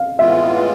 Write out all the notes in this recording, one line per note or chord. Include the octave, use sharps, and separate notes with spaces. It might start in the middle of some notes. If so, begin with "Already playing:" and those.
Already playing: F5
A2 E3 G#3 B3 F4 E5